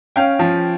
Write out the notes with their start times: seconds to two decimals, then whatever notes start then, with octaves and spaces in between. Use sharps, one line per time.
0.16 C#4 F5 G5
0.39 F3